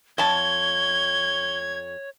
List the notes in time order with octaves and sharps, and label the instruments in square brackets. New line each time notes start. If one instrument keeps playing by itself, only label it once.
[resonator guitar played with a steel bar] F2 A5 [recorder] C#5 [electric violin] G#6 [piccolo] G7